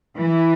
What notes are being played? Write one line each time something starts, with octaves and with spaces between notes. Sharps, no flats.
E3